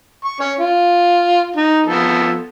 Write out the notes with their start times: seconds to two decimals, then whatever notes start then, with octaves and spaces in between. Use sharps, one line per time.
0.25 C#6
0.40 C#4 C#5
0.59 F4
1.56 D#4
1.86 F3 B3 A4